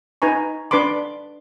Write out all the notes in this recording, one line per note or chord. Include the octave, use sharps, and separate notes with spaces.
D#4 B4 G#5 A#5 C#6
D4 B4 B5 C6 D6